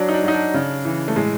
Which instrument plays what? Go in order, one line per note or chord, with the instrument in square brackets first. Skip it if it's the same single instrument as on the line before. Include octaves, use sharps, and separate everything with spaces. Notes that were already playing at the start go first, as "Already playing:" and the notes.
Already playing: [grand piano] F#3 D4
D#4
D4
F#3 D#4
D4
C#3
E3
A3
A2 G#3